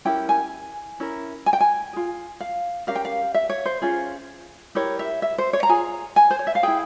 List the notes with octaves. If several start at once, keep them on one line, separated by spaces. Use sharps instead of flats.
C#4 E4 G4 A#4 G5
G#5
C#4 E4 A#4
G#5
G5
G#5
F4 G#4
F5
C#4 G4 A#4 F5
G5
F5
E5
C#5
C5
C#4 F4 G#4
E4 G4 A#4 C#5
E5
E5
C5
C#5
A#5
F4 G#4 G#5
G#5
C5
C#5
E5
F5
E4 G#4 G5